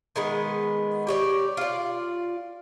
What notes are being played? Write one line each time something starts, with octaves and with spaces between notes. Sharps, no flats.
D#3 G#3 B3
G4 C#5 D5
F4 D5